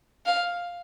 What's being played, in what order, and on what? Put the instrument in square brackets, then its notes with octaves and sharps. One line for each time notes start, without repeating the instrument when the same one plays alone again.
[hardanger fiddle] F5